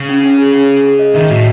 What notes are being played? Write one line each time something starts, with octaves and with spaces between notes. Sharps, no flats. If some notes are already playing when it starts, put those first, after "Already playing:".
Already playing: C#3
C#4
C#4
G#4
C#4
G#4
G#4
D#5
D#3 E5
A2 F#4